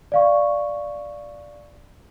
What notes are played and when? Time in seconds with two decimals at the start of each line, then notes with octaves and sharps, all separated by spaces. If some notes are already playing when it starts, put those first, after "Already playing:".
0.12 D5 F5 C#6